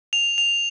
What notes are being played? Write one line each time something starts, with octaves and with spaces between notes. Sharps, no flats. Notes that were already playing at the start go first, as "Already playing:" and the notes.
F7
F7